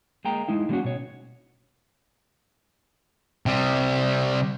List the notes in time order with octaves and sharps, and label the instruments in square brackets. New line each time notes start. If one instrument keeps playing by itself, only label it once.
[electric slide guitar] G#3 A#3 G5 A#5
G#3 D#4 E4 F5
D3 G3 A#3 C4 C#4 F#4
B2 C#5
[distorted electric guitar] C3 G3